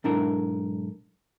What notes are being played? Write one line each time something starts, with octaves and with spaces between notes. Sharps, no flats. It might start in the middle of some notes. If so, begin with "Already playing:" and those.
B1 G#2 D4 E4 A#4